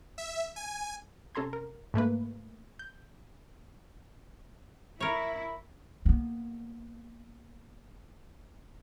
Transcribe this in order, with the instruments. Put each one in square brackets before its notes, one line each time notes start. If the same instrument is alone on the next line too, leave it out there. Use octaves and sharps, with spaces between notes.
[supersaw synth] E5
G#5
[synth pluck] C3 C#4 A4 A#5 C6 G#6
A#4
G#2 A3 A#3 B4
G6
[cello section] E4 [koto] A#4 C#5
[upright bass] A#3 B3